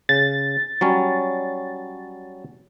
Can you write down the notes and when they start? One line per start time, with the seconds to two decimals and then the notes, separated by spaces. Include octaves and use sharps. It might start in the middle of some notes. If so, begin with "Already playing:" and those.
0.09 C#3 A6
0.81 F#3 G3 C#4